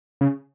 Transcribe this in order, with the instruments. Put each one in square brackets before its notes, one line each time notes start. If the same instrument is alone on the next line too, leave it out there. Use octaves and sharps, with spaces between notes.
[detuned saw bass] C#3